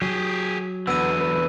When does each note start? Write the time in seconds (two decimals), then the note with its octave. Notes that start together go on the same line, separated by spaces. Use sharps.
0.02 F#3 G4 G#4
0.87 E2 D3 B3 E6 D#7
1.21 B4